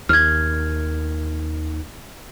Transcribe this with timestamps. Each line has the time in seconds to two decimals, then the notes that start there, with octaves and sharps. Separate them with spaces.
0.09 D#2 F6 G#6